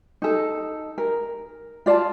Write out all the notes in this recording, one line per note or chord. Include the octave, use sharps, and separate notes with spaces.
D#4 A4
A#4
F4 D5 F5 A5